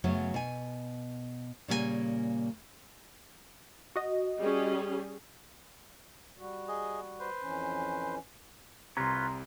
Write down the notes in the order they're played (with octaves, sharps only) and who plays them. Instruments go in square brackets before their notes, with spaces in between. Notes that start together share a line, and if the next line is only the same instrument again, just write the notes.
[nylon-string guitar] F#2 C#3 F#3 A3 B3 C#4
B2 G#5
A#2 C#3 G3 A#3 A#4 G#5
[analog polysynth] F#4 D#5
[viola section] G3 C#4 G#4
[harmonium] G3 F#4
[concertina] G#4 D#5
B4 C5
[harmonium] F2 E3 C#4
[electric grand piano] C2 C3 [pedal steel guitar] F4 B4 C#5 [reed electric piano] A#5 C6